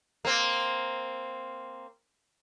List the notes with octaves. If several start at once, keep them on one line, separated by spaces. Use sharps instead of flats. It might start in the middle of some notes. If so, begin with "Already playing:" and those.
A#3 C4